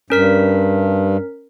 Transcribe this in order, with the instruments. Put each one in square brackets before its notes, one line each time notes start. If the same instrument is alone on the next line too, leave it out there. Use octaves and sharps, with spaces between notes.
[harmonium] G2 [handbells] C#4 A#4 B6